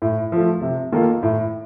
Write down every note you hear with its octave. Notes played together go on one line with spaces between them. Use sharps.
A2
F3 A3
C3
D#3 A#3 F4 A4
A2